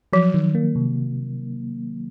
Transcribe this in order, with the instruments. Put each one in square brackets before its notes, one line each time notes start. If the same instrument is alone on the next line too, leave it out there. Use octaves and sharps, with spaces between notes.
[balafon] F3 [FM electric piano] F#3
[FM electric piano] D#3
A#3
C3